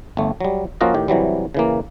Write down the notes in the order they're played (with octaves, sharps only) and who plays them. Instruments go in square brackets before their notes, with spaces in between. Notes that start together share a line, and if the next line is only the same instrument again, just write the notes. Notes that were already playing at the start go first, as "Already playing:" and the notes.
[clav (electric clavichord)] G1 A3
F#3 G3
F3 A#3 C#4 F4 F#4 D#5
A2 D#3 G4
C3 E3 F#3 G3
C#3 E3 A#3